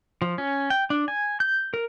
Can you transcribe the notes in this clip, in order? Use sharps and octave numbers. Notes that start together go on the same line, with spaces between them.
F3
C#4
G5
D4
G#5
G6
A#4